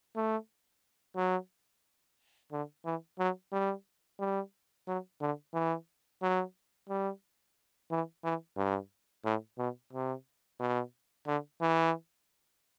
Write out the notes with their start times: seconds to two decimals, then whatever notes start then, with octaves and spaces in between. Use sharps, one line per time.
0.16 A3
1.16 F#3
2.52 D3
2.85 E3
3.19 F#3
3.52 G3
4.19 G3
4.88 F#3
5.21 D3
5.54 E3
6.22 F#3
6.89 G3
7.91 E3
8.24 E3
8.57 G2
9.25 A2
9.58 B2
9.93 C3
10.60 B2
11.27 D3
11.61 E3